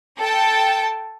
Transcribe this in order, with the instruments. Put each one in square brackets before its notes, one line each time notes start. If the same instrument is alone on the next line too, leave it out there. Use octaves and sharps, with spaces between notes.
[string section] A4 G5 A5